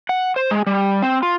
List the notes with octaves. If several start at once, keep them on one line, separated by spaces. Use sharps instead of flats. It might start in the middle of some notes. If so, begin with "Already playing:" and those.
F#5
C5
G#3
G3
C4
F4